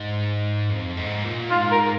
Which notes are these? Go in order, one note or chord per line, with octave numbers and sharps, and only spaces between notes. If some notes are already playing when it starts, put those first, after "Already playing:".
Already playing: G#2
F2
G#2
A#2
G#2 F4
A#4